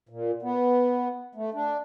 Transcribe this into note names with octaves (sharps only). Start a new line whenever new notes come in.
A#2
B3
A3
D4